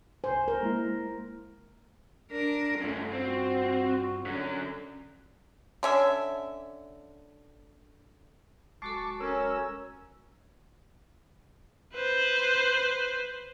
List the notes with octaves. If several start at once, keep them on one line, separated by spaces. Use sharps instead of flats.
C2 C5 G#5
A#4
G#3 A#3 E4
D4 A#4
G2 C#3 A3 F4
C4 F#4
D3 F#3 C#4
D3 C#4 E5
D1 G#3 F#4 A4 A5 C#6 D6
C#4 A#4 E6
B4 C5